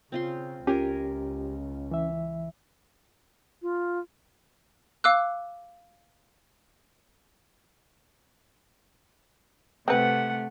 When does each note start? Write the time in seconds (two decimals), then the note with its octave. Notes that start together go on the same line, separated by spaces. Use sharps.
0.12 C#3 C4 F4 C6
0.67 C#2 C#4 F4 G4 A#4 G#5
1.91 E3 E5
3.62 F4
5.04 F5 D6 E6 F#6
9.88 C3 A3 C4 B4 F#5